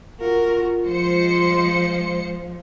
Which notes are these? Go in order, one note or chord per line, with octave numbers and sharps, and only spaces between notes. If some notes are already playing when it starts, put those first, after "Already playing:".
F4 F#4 A#4
F3 G#3 C5 C#7